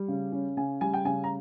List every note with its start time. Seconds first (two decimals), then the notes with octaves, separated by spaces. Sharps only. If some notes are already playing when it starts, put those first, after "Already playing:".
Already playing: G3
0.08 C#3
0.32 C#4
0.57 C#3 G#5
0.81 G3 G#5
0.94 G5
1.05 C#3 G#5
1.24 A#5